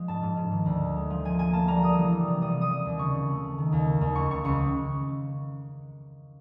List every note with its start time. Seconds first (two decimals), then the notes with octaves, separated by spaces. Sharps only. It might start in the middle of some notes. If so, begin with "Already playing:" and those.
Already playing: F3 G#3
0.08 G#2 A5
0.23 G#2
0.37 G#2
0.52 D#3
0.66 D2
0.80 G#3
0.96 G#3
1.10 F3
1.25 A#3 G#5
1.39 A#3 G#5
1.53 A#3 A5
1.68 G3 A#5
1.82 G3 D#6
1.98 E3
2.12 G3
2.27 C3
2.41 G3 D#6
2.56 G3
2.61 D#6
2.70 G3
2.85 D#2
2.99 C#3 C#6
3.15 C#3
3.29 A3
3.43 A3
3.58 D#3
3.72 D#2
3.86 A#3
4.01 D#2
4.15 C#2 C#6
4.30 C#2 C#6
4.45 C#2 C#6